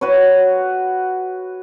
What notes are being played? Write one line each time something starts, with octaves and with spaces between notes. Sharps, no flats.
F#4 B4 C#5